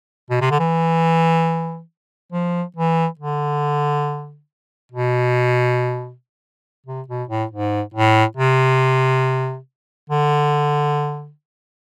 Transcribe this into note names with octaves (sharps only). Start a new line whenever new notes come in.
B2
C3
D3
E3
F3
E3
D3
B2
C3
B2
A2
G#2
A2
C3
D3